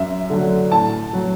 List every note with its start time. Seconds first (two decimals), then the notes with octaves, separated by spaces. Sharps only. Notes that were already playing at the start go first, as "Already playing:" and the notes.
Already playing: F#2 E5
0.30 D3 F#3
0.71 A2 A5
1.13 F#3